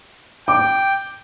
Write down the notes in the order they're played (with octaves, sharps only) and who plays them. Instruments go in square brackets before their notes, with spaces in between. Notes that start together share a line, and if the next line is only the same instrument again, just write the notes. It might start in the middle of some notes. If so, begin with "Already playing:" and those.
[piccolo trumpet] G5 [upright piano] D6